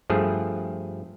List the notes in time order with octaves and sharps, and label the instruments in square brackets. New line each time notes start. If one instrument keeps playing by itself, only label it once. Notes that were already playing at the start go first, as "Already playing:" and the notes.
[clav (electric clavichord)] G2 F3 A3 G#4